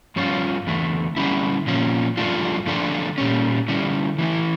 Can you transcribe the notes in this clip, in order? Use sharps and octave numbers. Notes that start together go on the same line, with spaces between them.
G2 F3 C#4 F4
E2 D3 A3
D3 G3 C#4 E4
A#2 F3 C#4
G2 F3 A3 D4 F4
D3 F3 A3 D4 F4
A#2 G3 C#4
D3 G3 C#4 E4
E3 A3 E4